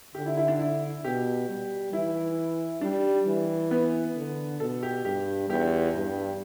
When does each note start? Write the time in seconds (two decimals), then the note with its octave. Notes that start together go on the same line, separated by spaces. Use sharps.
0.15 D3 G4
0.26 E4
0.37 E4
0.48 D4
0.59 E4
1.04 B2 G4
1.49 G3
1.93 E3 E4
2.81 G3 D4
3.27 E3
3.71 B3
4.16 D3
4.60 B2 A4
4.83 G4
5.05 G2 G4
5.49 E2 G4
5.94 G2